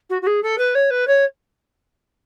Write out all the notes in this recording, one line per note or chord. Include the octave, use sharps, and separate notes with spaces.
F#4
F#4
G#4
A4
B4
C#5
B4
C#5